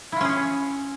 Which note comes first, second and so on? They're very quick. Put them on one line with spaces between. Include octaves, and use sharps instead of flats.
E4 F4 C#4 G#4 C#5